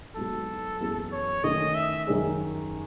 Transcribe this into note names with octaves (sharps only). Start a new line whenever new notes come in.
G#2 F#3 B3 F#4 A4
F#2 E3 B3 E4 G#4
C#5
D#3 A3 C#4 E4 D#5
E5
F#2 D#3 G#3 C#4 G#4